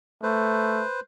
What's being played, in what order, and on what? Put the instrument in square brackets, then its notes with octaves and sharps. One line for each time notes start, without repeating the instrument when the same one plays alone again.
[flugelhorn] A3 [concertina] B4 C5